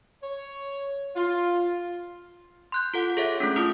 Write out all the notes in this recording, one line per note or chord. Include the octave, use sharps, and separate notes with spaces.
C#5
F4
C6 F#6 G6
F4 A4 F#5
G#4 A4 C#5 E5
A3 C#4 D4
E4 F4 D#6